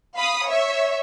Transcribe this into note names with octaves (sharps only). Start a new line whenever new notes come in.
F5 B5 D#6
C#5 E5